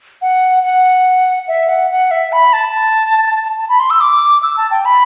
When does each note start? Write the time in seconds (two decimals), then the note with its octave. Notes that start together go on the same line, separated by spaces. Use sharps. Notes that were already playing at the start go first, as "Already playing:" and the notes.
0.22 F#5
0.63 F#5
1.48 E5
1.69 F#5
1.90 F#5
2.11 E5
2.32 B5
2.53 A5
3.59 A5
3.69 B5
3.80 C6
3.90 E6
4.01 D6
4.43 E6
4.57 A5
4.71 G5
4.85 B5